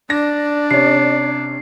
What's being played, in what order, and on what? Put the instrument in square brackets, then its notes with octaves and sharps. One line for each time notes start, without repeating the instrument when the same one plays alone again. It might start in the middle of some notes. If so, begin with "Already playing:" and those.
[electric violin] D4 [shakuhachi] D5 [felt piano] A#6
[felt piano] C3 C#4 [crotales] C7